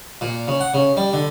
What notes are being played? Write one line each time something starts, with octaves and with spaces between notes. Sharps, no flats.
A#2
C#3
F#5
C#3
G3
D3